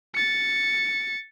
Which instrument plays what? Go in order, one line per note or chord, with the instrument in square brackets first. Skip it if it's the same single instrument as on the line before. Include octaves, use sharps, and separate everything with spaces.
[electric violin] A6 C#7